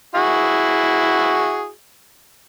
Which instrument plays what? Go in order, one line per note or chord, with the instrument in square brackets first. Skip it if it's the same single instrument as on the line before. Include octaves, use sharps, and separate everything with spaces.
[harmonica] E4 F#4 G#4